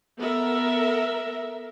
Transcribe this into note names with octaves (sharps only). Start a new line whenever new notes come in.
B3 A4 A#4 E5